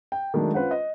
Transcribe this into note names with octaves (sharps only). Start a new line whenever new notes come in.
G5
D#3 F#3 G#3 A3 D4
C#4 F4 B4 C5 F#5
D#5